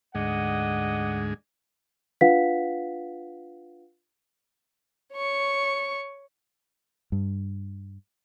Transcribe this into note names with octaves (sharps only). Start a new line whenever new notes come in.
D2 G#2 G#3 D5 D#5 F#5
D4 F4 B4 F5 F#5 B6
C#5 C#6
G2